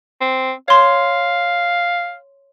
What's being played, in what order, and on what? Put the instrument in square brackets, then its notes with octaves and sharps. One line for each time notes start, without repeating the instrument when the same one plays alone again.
[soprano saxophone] C4
[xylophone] C#5 C6 [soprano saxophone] F5